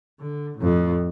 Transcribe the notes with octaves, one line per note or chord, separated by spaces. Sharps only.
D3
F2 A2